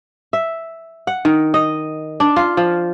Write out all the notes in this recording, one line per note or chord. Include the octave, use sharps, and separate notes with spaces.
E5
F#5
D#3
D#5
D4
F4
F3